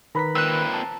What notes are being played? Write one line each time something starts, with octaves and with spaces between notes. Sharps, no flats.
D#3 B4 A#5 B5 B6
A#2 C4 E6 F#6
A5